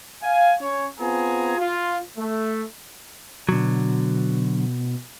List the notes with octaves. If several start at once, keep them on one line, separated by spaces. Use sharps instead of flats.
F5 G#5
C#4 C#5
B3 C4 F4 G#4 G#5 A#5
F4
A3
B2 D3 F#3